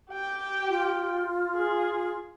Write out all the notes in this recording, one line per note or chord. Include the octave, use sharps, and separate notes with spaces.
G4 G5
F4
G#4